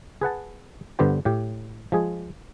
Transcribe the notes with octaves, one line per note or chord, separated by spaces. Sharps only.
G#4 B4 F#5 A5
G2 D3 B3 G4 C5 G5
A2 G4
F3 G#3 G#4